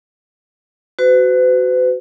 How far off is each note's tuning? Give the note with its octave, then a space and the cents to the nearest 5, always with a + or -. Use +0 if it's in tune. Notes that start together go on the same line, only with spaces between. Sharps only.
F#4 +10 B4 +45